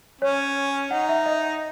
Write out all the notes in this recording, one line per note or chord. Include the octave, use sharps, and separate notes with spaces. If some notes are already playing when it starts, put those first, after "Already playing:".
C#4 C#5
D#4 F#5
E5
D#5